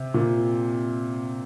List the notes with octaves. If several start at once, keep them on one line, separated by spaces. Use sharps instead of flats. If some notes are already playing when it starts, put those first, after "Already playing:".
Already playing: C3
A#2